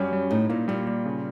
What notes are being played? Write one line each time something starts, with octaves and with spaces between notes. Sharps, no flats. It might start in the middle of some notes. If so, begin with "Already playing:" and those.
Already playing: F#2 G3 C#4
G3
A2 D#4
A#2 A#3
A#2 G3
G3
C#3